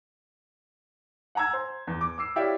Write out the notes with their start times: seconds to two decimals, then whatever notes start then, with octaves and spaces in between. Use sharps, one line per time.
1.35 F#5 G#5 A#5 E6 G#6
1.53 C5
1.87 E2
2.01 D6
2.18 D6 E6 C7
2.36 E4 G4 C#5 D5 E5 F5